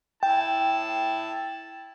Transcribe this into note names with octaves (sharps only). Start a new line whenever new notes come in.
E4 G5 A5